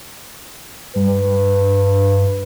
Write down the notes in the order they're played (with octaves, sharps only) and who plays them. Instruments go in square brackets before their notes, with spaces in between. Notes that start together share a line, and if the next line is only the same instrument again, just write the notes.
[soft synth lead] G2 [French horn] B4